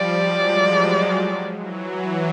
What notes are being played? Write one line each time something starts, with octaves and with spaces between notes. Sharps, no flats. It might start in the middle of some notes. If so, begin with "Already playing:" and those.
Already playing: F3 G3 D5
F#3 G#3
E3 F#3